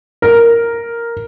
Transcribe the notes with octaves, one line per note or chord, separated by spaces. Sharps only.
A#4